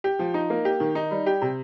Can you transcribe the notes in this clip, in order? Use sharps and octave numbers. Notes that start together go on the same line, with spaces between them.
G4
F3
D#4
A#3
G4
D#3
D#4
G3
G4
C3